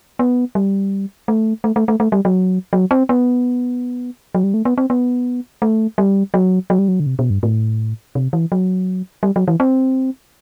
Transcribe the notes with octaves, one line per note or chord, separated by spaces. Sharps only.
B3
G3
A3
A3
A3
A3
A3
G3
F#3
F#3
C4
B3
F#3
G3
A3
B3
C4
B3
A3
G3
F#3
F#3
G3
F#3
D3
C3
B2
G2
A2
C3
E3
F#3
G3
F#3
E3
C4